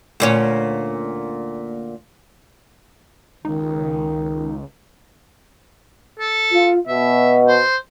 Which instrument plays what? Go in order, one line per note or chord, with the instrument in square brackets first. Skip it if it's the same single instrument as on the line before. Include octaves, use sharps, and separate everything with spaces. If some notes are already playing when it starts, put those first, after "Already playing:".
[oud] D2 A#2 C#4
[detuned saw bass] C#2 [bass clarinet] D#3 [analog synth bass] D#4
[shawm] A4
[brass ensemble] F4
[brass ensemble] B2 [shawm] E5
[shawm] C5